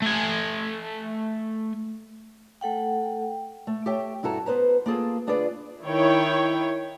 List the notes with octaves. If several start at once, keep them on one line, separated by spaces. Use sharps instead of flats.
A3 G#5
A3 A4 F#5 G5
A3
G4 A4 C#5 E5 G5
G2 E4 F#4 A4 A#5
B3 B4 C5 A#5
A#3 F4 G#4 A4
D2 D4 F4 G#4 B4 D5
D#3 E4 C#5 G5